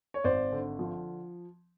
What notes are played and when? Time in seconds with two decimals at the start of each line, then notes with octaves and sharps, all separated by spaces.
0.14 C#5
0.24 G#1 C5 D5
0.52 D3
0.79 F3